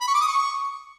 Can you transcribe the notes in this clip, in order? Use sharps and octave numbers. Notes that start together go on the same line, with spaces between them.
B5
C#6
D6
D#6
C#6